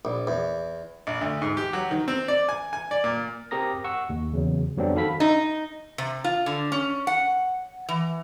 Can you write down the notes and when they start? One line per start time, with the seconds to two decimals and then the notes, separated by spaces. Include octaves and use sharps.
0.05 A#1
0.27 E2
1.07 A#1
1.21 D2
1.42 G#2
1.57 G4
1.73 F#3
1.91 D#3
2.08 C4
2.28 D5
2.49 G#5
2.73 G#5
2.91 D5
3.04 A#2
3.51 C4 G4 A#4 A#5 D#6 A#6
3.84 F#5 C#6 E6
4.09 D#2
4.33 E2 C#3 F#3
4.77 F2 F#3 G3 B3 C4 D4
4.94 D#3 F#4 A4 F5 B5 B6
5.20 D#4
5.98 C3
6.24 F4
6.46 D3
6.72 C#4
7.07 F#5
7.89 E3